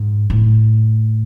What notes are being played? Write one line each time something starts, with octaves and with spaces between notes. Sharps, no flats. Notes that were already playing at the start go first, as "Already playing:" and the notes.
Already playing: G#2
A2